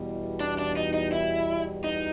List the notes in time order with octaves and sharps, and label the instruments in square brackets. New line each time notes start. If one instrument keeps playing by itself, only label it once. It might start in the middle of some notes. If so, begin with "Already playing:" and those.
Already playing: [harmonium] E2 B2 G3
[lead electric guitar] D4
D4
D#4
D#4
E4
D#4